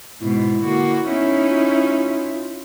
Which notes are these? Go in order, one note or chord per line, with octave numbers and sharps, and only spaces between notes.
G#2 B2 G#3 E4
D3 A#3 F#4
B3 C#4 D#4 E4
F4